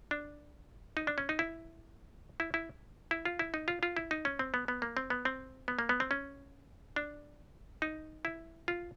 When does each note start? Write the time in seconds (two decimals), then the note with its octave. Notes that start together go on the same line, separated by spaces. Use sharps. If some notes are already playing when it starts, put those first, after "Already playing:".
0.11 D4
0.97 D#4
1.07 D4
1.18 C#4
1.29 D#4
1.39 E4
2.40 E4
2.54 E4
3.11 E4
3.25 F4
3.39 E4
3.54 D#4
3.68 F4
3.83 F4
3.97 E4
4.11 D#4
4.25 C#4
4.39 C4
4.54 B3
4.68 B3
4.82 A#3
4.97 C4
5.10 B3
5.25 C4
5.68 B3
5.79 A#3
5.89 B3
6.00 C4
6.11 C#4
6.96 D4
7.82 D#4
8.25 E4
8.68 F4